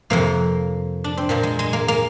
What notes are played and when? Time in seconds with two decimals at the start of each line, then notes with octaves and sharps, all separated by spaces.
0.10 F2 C3 F3 A#3
1.04 D4
1.17 C4
1.29 A#2 F3 A#3
1.43 G#3
1.59 G#3
1.73 A#3
1.88 A#3